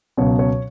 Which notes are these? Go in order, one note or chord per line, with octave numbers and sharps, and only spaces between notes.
C#2 B2 F#3 C#5
C#5